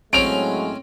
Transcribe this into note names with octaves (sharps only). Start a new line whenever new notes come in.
A2 F#3 G#3 C4 C#4 D7 F7